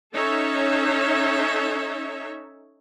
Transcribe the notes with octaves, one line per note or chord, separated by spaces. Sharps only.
C#4 D#4 A4 C#5 E5